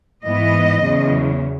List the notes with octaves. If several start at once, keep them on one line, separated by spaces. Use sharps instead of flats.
G#2 E3 B3 D#5
E2 C#3 F#3